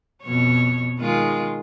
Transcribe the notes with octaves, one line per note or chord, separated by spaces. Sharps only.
F2 B2 C#5
D#3 G#3 F4